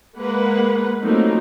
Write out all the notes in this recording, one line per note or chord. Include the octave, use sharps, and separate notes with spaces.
G#3 A#3 B4 F#5
F3 F#3 A3 A#3 C4 D#4